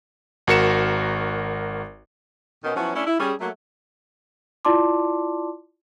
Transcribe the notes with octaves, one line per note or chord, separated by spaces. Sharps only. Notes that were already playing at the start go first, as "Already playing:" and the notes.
G#1 F#4 A#4 C#7 E7
B2 D#3 C#4
F3 F#3 B3 C#4 E4 F#4
A3 C#4 D4 E4
E4
G3 C#4 G#4
F#3 A3 A#3
E4 F4 D5 A5 C6 D6